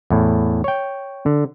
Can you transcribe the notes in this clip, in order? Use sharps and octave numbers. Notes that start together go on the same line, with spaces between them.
E2 A2
C#5 G5
D3